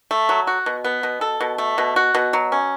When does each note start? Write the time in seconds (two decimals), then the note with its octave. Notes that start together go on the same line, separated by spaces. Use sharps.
0.11 A3
0.29 F#3
0.47 F#4
0.66 B2
0.84 B3
1.03 B2
1.21 A4
1.41 B2
1.58 A3
1.78 B2
1.96 F#4
2.15 B2
2.33 F#3
2.52 C#4